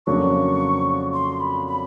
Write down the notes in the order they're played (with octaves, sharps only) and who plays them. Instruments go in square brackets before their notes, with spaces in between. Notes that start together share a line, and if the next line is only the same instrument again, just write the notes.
[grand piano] F2 C#3 F#3 A#3 D4 [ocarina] C#6
[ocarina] C6
B5
B5